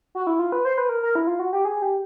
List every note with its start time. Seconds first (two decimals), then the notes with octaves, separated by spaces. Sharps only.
0.15 F#4
0.27 E4
0.39 F4
0.52 B4
0.65 C5
0.78 B4
0.89 A#4
1.03 A#4
1.15 E4
1.27 F4
1.39 F#4
1.53 G4
1.65 G#4
1.82 G4